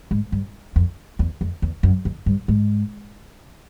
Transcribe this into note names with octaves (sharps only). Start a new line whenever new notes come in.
G#2
G2
F2
E2
F2
E2
F#2
F2
G2
G#2